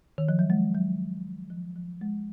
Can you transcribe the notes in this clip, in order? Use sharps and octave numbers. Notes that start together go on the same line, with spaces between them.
D#3
F3
F#3
G#3
F#3
F3
F3
G#3